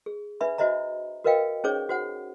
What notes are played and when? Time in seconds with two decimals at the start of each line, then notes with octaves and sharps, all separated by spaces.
0.06 G#4
0.41 D4 B4 E5 B5
0.58 D4 F#4 C5 D#5 E5 A#5
1.24 F#4 A#4 B4 D#5 F5 G5
1.64 C#4 D#4 G#4 C5 C#5 D6
1.89 F#4 C5 F#5